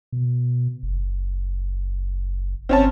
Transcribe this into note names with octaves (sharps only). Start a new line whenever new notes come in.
B2
F#1
G1 C4 C#4 A5